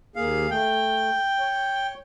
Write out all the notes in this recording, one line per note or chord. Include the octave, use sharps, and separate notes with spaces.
D#2 A#3 G#4 F5
A3 G5
C#5